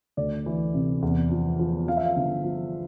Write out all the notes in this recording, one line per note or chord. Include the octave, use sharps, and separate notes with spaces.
D2 D5
E3
C3
E2
F3
F3
F3 F5
E5
F5
G1
F3